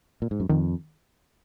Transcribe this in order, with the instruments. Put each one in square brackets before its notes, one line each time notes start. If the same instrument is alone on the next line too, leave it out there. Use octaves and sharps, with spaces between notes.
[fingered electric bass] A#2
G#2
F#2
[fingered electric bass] F2 [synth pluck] D#3